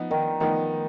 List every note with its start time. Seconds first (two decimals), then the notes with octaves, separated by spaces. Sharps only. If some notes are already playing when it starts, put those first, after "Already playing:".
Already playing: F3 B3 D#4
0.11 D#3
0.40 D#3 F3 B3 D#4